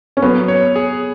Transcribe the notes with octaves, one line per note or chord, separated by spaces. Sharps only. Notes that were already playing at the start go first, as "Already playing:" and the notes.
C#4
F#3 B3
C#5
G#4